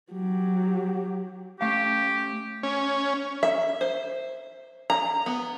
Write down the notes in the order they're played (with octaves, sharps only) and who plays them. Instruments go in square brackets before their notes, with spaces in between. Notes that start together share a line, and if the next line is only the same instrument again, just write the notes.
[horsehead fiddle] F#3 G4
[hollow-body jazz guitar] A3 F5 [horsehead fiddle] C#4 [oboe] G4
[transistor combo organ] C#4
[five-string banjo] E5
C5
A#5
B3